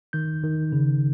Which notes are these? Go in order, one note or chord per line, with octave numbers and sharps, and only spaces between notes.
D#3 G6
D#3
C#3